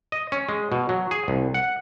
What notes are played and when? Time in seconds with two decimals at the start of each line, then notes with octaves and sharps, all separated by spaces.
0.12 D#5
0.32 C#4
0.49 G#3
0.72 B2
0.89 F#3
1.11 G#4
1.28 C2
1.54 F#5